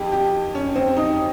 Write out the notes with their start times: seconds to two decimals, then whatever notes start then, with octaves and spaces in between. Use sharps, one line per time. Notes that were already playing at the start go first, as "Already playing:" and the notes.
Already playing: F2 D#3 G4
0.12 G4
0.55 C#4
0.76 C4
0.97 D#4